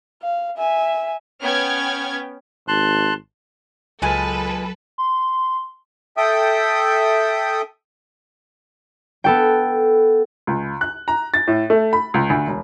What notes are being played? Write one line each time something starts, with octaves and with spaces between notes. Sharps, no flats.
F5
E5 G#5
B3 C#4 G5 F6 G#6
G#1 A5 C6 F#6
C#2 A#2 F#3 G#3 A4 B4 G#5
C6
A4 E5 G5 D#6
B3 A4 G5
C#2
F#6
A#5
A6
A2
A3
B5
C#2
D2
E1